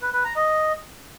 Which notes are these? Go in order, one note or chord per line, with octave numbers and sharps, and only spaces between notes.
B4
B4
A#5
D#5